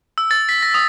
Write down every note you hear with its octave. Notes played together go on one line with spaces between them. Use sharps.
E6
A6
B6
A#6
D#6